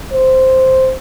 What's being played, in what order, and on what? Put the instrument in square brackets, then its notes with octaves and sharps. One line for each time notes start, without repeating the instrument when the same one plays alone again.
[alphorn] C5